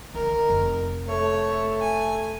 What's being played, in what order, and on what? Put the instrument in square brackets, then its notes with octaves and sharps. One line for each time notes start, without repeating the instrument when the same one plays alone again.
[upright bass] D3 [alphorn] D#3 [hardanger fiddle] A#4
[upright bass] F1
[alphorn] A3 [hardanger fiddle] C#5
[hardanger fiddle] G#5